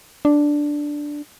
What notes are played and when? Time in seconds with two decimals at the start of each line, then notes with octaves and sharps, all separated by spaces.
0.25 D4